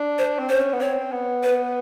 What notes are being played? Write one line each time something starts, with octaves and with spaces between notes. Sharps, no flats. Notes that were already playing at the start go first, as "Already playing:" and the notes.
Already playing: D4
C5
C4
C#4 C5
B3
C4 C#5
B3
B4